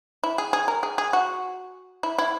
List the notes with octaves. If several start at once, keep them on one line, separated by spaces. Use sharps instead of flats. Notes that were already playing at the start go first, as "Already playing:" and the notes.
E4
G#4
G#4
A#4
G#4
G#4
F#4
E4
E4